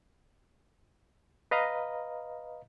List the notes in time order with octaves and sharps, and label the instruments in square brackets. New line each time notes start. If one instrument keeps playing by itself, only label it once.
[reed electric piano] B4 D#5 F5 A#5